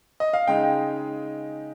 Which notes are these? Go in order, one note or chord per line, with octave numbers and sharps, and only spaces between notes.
D#5
F5
C#3 G#3 D#4 G5